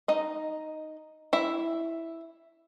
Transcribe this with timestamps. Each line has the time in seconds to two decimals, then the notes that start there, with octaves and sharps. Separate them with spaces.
0.08 D#4 D#5
1.33 E4 E5